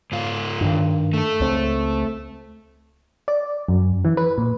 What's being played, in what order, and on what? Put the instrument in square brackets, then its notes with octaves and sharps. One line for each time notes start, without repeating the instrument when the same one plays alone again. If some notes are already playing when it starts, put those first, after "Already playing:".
[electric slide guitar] G#2 F4
[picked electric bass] G2 D#3
[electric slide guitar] A3 A4
[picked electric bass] C#2 C4
[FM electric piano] D5
F#2
E3
B4
A#2